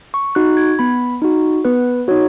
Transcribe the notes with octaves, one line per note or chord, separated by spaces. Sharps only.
C#6
D#4 F#4 F#6
G#6
B3 B5
D#4 F#4
B3 B4
D#4 F#4 C#5